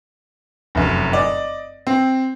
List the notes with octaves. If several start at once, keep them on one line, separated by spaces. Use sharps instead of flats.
F1 F#2
D5 D#5
C4